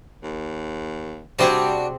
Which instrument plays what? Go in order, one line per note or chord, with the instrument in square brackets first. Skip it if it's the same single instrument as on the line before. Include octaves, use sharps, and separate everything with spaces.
[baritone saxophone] D#2
[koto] C3 C4 G#4 [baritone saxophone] G3 [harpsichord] D4 F#4